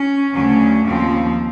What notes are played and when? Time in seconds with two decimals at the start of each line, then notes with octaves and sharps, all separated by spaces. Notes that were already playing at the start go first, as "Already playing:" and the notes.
Already playing: C#4
0.33 D2 C#3 F#3 C#4
0.85 D#2 C#3 F3 C4